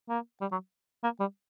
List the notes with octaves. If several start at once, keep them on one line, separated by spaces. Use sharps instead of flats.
A#3
G3
F#3
A#3
G3